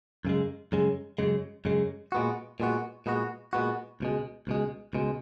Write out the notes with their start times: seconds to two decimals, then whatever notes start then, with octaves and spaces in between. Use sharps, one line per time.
0.25 F#2 C#3 G#3
0.72 F#2 C#3 G#3
1.18 F#2 C#3 G#3
1.65 F#2 C#3 G#3
2.12 A#2 G#3 B3 F#4
2.60 A#2 G#3 B3 F#4
3.06 A#2 G#3 B3 F#4
3.53 A#2 G#3 B3 F#4
4.00 C#2 B2 G#3
4.47 C#2 B2 G#3
4.93 C#2 B2 G#3